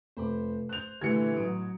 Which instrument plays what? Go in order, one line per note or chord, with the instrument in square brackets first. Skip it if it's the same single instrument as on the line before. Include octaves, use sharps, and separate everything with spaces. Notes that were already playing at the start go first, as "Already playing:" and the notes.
[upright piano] F1 [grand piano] C5 B5 D6
[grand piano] C5 G6 [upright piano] F#6 F7
[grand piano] A#1 D3 G3 [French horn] E3 [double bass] A3 [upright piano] G#6 C#7
[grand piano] A1 D#6 D7 [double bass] F#3